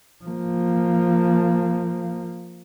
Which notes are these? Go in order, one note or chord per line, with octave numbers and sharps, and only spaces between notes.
F3 A#3